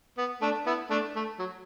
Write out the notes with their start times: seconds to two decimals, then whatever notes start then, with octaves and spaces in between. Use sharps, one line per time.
0.18 B3
0.41 A3 D4
0.66 B3 E4
0.90 A3 D4
1.15 A3
1.39 F#3